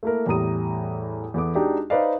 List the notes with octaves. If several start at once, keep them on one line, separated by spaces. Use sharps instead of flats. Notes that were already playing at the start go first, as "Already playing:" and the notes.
A3 A#3 E4 A4 A#4
E2 A2 G3 A#5 D#6 D#7
E2 B3 A4 D6
G#3 D4 D#4 F#4 G4
D#4 B4 C5 D5 D#5 F5